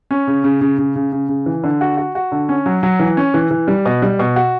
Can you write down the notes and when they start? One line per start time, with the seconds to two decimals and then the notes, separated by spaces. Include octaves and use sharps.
0.11 C#4
0.27 C#3
0.44 C#3
0.61 C#3
0.78 C#3
0.96 C#3
1.12 C#3
1.29 C#3
1.46 E3
1.64 D3
1.81 F#4
1.97 F#4
2.15 F#4
2.32 D3
2.49 C#4
2.66 F#3
2.83 F#3
2.99 E3
3.17 C#4
3.34 E3
3.51 E3
3.68 G3
3.86 B2
4.02 G3
4.19 B2
4.36 F#4